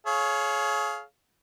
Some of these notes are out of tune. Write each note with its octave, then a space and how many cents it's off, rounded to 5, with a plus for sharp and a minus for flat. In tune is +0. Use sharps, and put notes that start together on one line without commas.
G#4 +35 C#5 +0 F5 +0